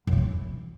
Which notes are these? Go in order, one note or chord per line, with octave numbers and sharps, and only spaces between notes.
F#2
D3
E3